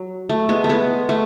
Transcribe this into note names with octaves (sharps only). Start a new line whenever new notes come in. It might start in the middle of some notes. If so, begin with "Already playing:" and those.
Already playing: F#3
A3
G#3 B3
A3
G#3 B3
A3